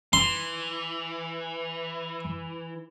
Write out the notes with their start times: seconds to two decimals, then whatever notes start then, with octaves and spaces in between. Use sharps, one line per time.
0.13 E3 C6